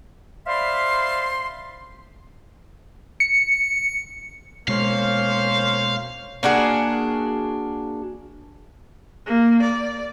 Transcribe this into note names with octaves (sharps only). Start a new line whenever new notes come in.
C5 D5 E5 F5 B5 C6
C#7
B2 G#3 A#3 C#4 C5 F5
A#3 D4 F#4 G#4
A#3
D5